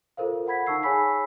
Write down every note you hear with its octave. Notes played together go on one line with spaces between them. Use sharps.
F4 A4 A#4 C5 F5
F5 F#5 B5 G#6 B6
D#4 A5 C#6 E6 C7
G#4 C#5 G#5 B5 E6 B6